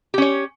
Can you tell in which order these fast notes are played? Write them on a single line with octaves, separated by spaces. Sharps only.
G4 C#4 C#5